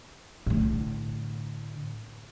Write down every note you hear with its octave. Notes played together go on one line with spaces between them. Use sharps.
A2 D3